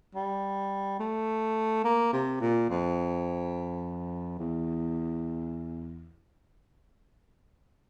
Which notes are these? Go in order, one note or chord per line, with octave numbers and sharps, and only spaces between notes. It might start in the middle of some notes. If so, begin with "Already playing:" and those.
G3
A3
A#3
C3
A#2
F2
E2